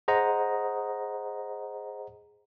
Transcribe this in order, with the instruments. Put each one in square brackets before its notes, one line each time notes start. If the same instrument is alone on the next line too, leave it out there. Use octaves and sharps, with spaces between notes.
[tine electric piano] G#4 C5 D#5 F#5 A#5